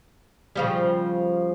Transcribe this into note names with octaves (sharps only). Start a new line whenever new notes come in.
C#3 F3 G3